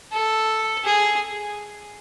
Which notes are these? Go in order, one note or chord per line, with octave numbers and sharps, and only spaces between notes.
A4
G#4